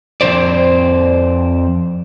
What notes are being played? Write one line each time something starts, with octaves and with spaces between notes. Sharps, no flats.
F2 C3 C5 D5